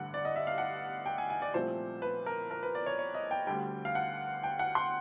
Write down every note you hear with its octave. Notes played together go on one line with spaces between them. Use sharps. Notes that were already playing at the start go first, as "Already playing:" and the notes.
Already playing: A1 G2 D3 F#5
D5
D#5
E5
F5
F#5
G5
G#5
G#5
D5
C2 A#2 F3 A3 C4 C5
B4
A#4
A#4
B4
D5
C#5
C#5
D#5
G5
D2 D3 G3 G5
F5
F#5
G5
F#5
C6